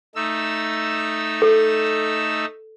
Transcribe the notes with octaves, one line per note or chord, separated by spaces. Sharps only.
A3 D#4 E6
A4